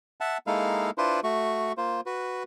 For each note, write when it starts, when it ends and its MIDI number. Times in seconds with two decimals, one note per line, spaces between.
0.21 0.38 76
0.21 0.38 78
0.21 0.38 81
0.47 0.90 56
0.47 0.90 58
0.47 0.90 63
0.47 0.90 64
0.47 0.90 69
0.47 0.90 77
0.98 1.20 62
0.98 1.20 64
0.98 1.20 65
0.98 1.20 71
0.98 1.20 72
1.24 1.72 57
1.24 1.72 66
1.24 1.72 85
1.77 2.01 58
1.77 2.01 65
1.77 2.01 72
2.06 2.43 66
2.06 2.43 71